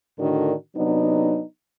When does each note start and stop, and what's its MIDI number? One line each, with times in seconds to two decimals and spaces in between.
0.18 0.54 45
0.18 0.54 50
0.18 0.54 51
0.18 0.54 62
0.18 0.54 66
0.18 0.54 70
0.76 1.43 48
0.76 1.43 54
0.76 1.43 59
0.76 1.43 62
0.76 1.43 63